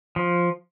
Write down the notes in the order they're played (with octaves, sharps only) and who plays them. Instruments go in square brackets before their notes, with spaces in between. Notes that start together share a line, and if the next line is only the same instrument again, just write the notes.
[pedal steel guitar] F3